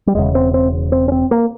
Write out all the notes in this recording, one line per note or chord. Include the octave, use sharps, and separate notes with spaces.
G3
E1 E2 C#3 G#3
C4
C4
C4
C#4
C4
A#3